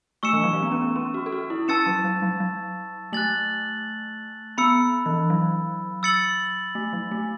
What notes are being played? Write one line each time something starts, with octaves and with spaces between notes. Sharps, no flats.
A3 C#6 E6 C#7 E7
E3
F#3
A3
B3
C#4
C#4
F#4
A4
F#4
E4
C#4 A5 E6 A6 C#7 E7
F#3
F#3
F#3
F#3
A3 F#6 A6 F#7
B3 B5 E6 C#7
E3
F#3
E6 A6 C#7 F#7
A3
F#3
A3